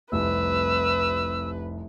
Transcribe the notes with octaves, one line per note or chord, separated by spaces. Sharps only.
F1 C2 B4 E6